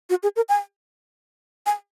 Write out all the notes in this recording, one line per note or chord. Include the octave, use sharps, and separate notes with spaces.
F#4
G#4
A#4
G#5
G#5